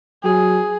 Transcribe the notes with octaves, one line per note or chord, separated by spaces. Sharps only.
F#3 G#4